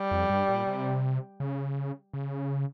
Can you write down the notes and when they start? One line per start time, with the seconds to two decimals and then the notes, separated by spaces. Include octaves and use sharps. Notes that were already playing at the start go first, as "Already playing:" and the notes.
Already playing: G3
0.11 F2
0.30 G2
0.48 A#2
0.67 C3
1.40 C#3
2.13 C#3